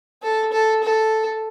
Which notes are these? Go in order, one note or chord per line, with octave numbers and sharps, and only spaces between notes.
A4
A4
A4